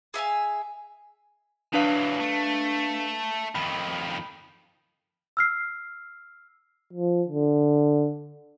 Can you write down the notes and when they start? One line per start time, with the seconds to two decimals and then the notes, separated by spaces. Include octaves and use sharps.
0.14 G#4 E5 F5 G#5
1.74 E3 F#3 D4 B4 F5
2.20 A3
3.55 F2 D#3 B5
5.37 E6 F6 C7
6.93 F3
7.27 D3